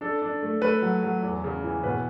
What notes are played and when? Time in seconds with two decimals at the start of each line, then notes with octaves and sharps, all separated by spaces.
0.01 D4 A4
0.22 D4
0.43 A3
0.62 A3 B4
0.82 F#3
1.03 F#3
1.23 E2
1.44 C#3
1.64 E3
1.83 B2 B4